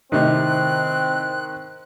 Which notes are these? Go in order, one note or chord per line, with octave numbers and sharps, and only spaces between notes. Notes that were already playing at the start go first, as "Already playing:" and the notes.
A2 C3 D#3 C4 D#4 F#6